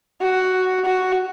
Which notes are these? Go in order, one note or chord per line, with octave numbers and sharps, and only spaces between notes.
F#4
F#4